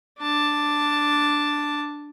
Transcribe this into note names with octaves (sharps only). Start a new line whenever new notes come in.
D4 A5